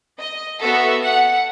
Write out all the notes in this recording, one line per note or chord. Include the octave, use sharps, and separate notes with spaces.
D#5
B3 F#4 A4 E5
F#5